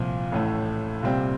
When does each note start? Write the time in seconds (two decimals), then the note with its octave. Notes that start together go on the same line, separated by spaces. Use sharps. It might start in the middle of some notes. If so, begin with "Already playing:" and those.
Already playing: C2 A#2 F3
0.32 A1 A2 A3
1.03 C2 A#2 G3 C4 G4